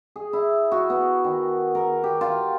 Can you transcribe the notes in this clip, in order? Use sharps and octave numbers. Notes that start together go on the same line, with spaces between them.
G#4
E4
F#4
B3
D#3
A#4
G4
F4